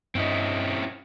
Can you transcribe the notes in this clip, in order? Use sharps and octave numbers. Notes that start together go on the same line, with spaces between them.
G2 C4 C#4 E4 D#5